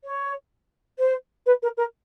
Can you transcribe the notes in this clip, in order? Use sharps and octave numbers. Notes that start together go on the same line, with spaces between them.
C#5
C5
B4
A#4
A#4